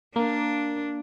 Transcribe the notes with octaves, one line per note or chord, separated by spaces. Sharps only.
A#3 D4